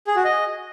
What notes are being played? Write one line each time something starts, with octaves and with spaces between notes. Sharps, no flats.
G#4
F#4
D#5